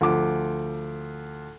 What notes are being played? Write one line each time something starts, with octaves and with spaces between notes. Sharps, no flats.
D2 F3 D6